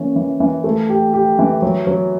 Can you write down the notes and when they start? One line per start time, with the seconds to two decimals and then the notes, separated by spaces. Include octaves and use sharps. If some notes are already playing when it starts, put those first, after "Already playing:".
Already playing: E3 A#3 C#4
0.16 E3
0.40 E3
0.64 A3
0.90 G4
1.14 G4
1.39 E3
1.62 F#3
1.87 F#3